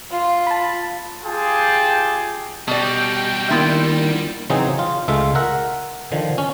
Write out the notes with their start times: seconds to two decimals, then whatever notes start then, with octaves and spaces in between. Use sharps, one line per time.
0.11 F4
0.47 A5 B5
1.24 F4 G4 G#4 G5 A5
2.68 B2 G3 D#4 G4 D5 G5
3.50 D#3 A#3 B3 D4 E4 F4
4.50 C#3 E3 F#3 C4 D#4 G#4
4.79 F4
5.08 C#2 G#3 A3 F4 E5
5.35 A#4 E5 F#5
6.12 D3 D#3 F3
6.38 C#4